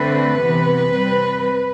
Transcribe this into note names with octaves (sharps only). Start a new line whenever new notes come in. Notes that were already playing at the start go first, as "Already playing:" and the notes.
Already playing: D3 A3 C4 B4
C3 E3 B3
C3 G3 C4